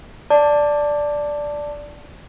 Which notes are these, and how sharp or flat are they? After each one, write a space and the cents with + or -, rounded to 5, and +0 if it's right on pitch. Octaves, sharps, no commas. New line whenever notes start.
D5 +0 A5 +10